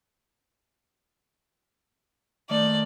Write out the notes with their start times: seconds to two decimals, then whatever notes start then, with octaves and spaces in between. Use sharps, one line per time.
2.49 D#3 A3 D5